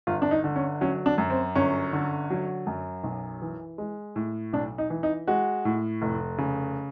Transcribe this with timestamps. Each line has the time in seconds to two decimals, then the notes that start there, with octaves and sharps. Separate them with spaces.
0.07 G1 F4
0.22 D4
0.31 D#4
0.44 D3
0.56 C#4
0.81 F#3 C#4
1.06 D4
1.18 F#2
1.30 C4
1.55 G1 C#4
1.93 D3
2.30 F#3
2.67 F#2
3.04 B1
3.42 E3
3.78 G#3
4.16 A2
4.53 B1 D4
4.78 D#4
4.90 E3
5.03 D#4
5.27 G#3 F#4
5.65 A2
6.02 F1
6.38 C#3